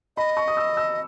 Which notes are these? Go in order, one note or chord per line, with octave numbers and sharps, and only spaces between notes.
D#5 B5
C#6
D#6
E6
E6